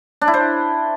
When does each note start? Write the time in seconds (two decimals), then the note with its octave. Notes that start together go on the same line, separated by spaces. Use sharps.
0.21 D4
0.28 E4
0.34 C5